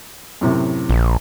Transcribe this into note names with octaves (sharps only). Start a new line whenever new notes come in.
F#2 A2 C3
A#1